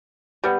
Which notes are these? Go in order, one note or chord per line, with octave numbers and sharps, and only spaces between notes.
G3 B3